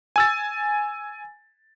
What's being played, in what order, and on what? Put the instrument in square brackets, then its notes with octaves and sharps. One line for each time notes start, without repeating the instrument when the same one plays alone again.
[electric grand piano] G#5 E6 A6